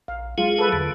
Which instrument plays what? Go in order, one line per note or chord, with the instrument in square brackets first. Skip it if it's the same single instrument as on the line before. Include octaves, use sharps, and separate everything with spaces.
[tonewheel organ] A#1 [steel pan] F5
[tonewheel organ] F#3 G#3 G#4 [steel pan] F4
[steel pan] A4 B4
[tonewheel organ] E2 D3